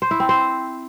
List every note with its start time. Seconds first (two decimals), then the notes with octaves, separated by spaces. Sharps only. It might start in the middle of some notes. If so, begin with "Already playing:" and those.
0.02 C5
0.11 E4
0.20 C4
0.29 C5